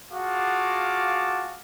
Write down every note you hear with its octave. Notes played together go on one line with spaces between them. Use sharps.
F4 F#4 G#4 F5 A5 D6